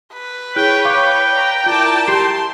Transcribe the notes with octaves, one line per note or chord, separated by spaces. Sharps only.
B4
E4 G#4 C#5 G5 F#6
F5 G5 C#6 D6
D5 A#5
E4 F4 A#4 D5 A5
G4 C6 G6 C7